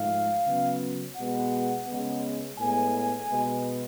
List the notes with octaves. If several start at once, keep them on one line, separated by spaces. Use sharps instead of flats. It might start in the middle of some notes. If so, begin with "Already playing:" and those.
Already playing: G#2 F3 A3 F5
C#3 F#3 B3
B2 G#3 B3 F#5
C#3 G#3 B3
A2 G#3 B3 G#5
B2 G#3 B3